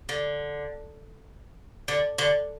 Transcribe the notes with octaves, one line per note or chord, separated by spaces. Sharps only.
D3
D3
D3